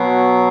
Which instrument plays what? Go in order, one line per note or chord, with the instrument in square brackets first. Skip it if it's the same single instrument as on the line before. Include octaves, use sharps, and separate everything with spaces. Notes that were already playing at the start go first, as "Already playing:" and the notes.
Already playing: [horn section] B2 F#3